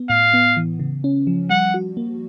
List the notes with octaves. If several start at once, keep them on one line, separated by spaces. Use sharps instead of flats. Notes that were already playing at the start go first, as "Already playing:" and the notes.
Already playing: B3
A2 F5
B3
E3
C#3
C#4
F3
G3 F#5
F#4
A#3